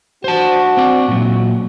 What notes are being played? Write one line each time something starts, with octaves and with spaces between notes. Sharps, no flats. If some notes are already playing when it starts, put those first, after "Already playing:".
D4 F#4 C5 A5
C4 D5
A#2 F#3